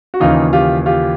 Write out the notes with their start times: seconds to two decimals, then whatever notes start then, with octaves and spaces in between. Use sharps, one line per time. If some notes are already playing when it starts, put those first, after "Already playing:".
0.14 F#4
0.20 D#2 C#3 E3 D#4 F4
0.53 F4 G4
0.86 F4 G4